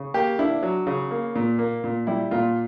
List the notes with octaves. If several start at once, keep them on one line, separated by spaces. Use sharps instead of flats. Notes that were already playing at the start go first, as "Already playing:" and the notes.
Already playing: C#3
A#3 G4
D4 E4
F#3
C#3
A#3
A#2
A#3
A#2
G3 E4
A#2 F4